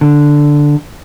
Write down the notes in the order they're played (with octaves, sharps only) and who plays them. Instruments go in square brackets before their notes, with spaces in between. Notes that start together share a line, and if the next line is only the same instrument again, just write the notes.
[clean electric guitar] D3